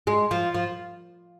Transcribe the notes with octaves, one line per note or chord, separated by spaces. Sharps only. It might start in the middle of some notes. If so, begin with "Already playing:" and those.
G#3
F3
F3